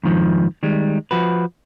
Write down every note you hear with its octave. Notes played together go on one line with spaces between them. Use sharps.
F2 G#2 D#3 F3
D#3 G3 G#3
F3 F#4 B4